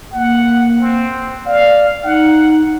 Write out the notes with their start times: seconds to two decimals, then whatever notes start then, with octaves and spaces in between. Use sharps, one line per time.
0.13 A#3 F#5
0.81 C4
1.46 D5 F5
2.04 D#4 F#5